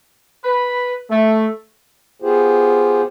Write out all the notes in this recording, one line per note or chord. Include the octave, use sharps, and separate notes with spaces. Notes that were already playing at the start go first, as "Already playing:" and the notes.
B4
A3
B3 F4 G4 G#4 C5